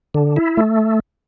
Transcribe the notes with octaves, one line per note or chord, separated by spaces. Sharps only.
D3
E4
A3